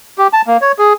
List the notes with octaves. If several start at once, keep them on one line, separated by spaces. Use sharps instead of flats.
G4
A5
A#3
C#5
G#4